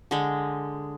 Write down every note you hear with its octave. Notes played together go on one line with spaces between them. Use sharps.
D3 G#3